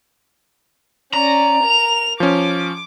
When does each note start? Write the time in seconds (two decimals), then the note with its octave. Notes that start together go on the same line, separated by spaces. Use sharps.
1.13 C#4 D5 A#5
1.63 A#4 F7
2.20 F3 C#4 D6